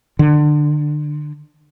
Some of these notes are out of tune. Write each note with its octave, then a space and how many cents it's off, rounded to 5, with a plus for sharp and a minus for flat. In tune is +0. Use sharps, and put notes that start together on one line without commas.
D3 +25